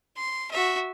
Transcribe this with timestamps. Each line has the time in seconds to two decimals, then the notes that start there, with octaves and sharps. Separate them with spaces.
0.17 C6
0.51 F#4 E5